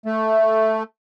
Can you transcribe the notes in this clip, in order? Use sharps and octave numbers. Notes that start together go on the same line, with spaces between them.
A3